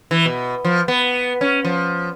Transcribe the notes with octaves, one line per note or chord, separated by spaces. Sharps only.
E3
B2
F3
B3
C#4
F3